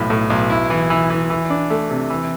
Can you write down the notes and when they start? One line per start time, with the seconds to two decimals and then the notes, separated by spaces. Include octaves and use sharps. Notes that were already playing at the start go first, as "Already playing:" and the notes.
Already playing: B1 A2 F3
0.10 A2
0.30 B1
0.50 E4
0.70 E3
0.90 E3
1.10 E3
1.30 E3
1.50 D4
1.70 A3
1.90 C3
2.10 E3